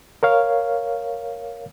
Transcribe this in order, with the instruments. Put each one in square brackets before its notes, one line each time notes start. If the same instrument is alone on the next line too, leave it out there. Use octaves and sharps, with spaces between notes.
[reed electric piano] A#4 C#5 F5